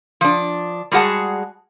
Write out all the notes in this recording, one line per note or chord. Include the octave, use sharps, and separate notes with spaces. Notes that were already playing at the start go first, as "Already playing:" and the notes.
F3 D4
G3 G#3 F#4 G#4 F#5 A5